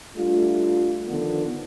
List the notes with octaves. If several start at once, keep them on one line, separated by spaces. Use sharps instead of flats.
G3 A3 D4 F4
D3 D#3 F3 B3